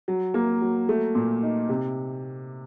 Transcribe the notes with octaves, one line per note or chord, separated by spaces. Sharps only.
F#3
A#3
F#3
A3
A#2
D#4
C3